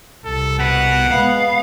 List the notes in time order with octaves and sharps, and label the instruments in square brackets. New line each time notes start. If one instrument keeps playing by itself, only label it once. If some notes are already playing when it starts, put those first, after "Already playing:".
[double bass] C2 [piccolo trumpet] A4
[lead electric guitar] B2 B4 [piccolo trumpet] F#5
[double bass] G#3 B3 [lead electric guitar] F5